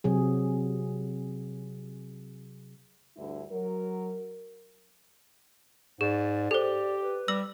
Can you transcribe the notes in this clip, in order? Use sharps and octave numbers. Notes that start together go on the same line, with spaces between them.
C3 F#3 G#4
D2 G2 E4
F#3 A#4
G#2 G#4 D5
G4 A4 C5
B4
G3 E6 A#6 F#7